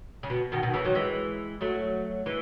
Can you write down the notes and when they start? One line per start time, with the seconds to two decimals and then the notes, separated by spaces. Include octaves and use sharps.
0.23 C#3
0.30 B2
0.52 B2 D#3
0.63 B2 D#3
0.74 C#3 E3
0.84 D#3 F#3
0.95 E3 G#3
1.61 F#3 A3
2.26 E3 G#3